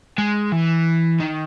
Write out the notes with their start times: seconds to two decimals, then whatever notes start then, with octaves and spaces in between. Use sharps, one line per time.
0.18 G#3
0.52 E3
1.20 D#3